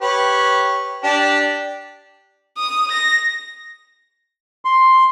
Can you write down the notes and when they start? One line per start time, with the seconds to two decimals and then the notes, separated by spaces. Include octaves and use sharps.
0.02 G4 B4 C#5
1.04 D4 G4 D5
2.58 D#6
2.91 A#6
4.65 C6